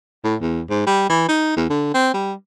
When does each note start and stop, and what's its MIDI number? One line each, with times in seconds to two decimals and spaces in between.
0.24 0.35 45
0.41 0.61 40
0.70 0.83 44
0.87 1.09 55
1.09 1.28 52
1.29 1.55 63
1.56 1.65 40
1.70 1.94 50
1.94 2.13 60
2.14 2.33 55